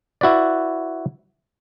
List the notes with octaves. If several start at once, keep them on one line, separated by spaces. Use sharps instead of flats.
E4 F#4 B4 D5